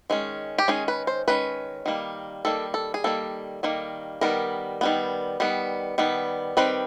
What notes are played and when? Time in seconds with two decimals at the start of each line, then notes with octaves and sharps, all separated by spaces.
0.10 D#3 G#3 C#4
0.58 G4
0.68 D#3 G#3 C#4 G#4
0.88 B4
1.07 C5
1.28 D#3 G#3 C#4 B4
1.86 D#3 G3 A#3
2.45 D#3 G3 A#3 A4
2.74 A4
2.94 G#4
3.04 D#3 G3 A#3 A4
3.63 D#3 G3 A#3
4.21 D#3 G3 B3 A#4
4.81 D#3 G3 B3
5.40 D#3 G3 B3
5.98 D#3 G3 B3
6.57 D#3 G3 C4 B4